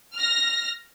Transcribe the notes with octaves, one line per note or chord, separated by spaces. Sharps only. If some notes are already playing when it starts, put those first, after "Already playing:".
F6 A#6